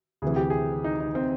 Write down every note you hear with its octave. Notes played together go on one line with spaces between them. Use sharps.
D2 C3 E3 G#4
G4
G#4
D#4
D#4
C4